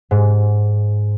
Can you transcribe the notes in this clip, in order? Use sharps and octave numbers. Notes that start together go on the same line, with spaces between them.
G#2